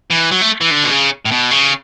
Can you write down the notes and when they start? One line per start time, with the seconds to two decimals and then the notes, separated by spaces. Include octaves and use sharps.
0.10 E3
0.31 F#3
0.41 A3
0.61 E3
0.71 D3
0.84 B2
0.91 C#3
1.25 A2
1.31 B2
1.51 C#3